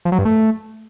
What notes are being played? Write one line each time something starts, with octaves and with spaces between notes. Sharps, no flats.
F3
F#3
G2
A3